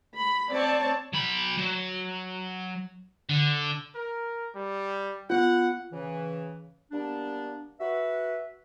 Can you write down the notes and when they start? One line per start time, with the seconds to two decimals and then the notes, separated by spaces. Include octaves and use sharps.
0.17 B5
0.52 C4 C#5 D5 A5
1.13 F#3 B5
1.58 F#3
3.30 D3
3.95 A#4
4.55 G3
5.30 B3 F4 F#5
5.92 C#3 E3
6.91 G3 A#3 B3 D4
7.79 F#4 B4 E5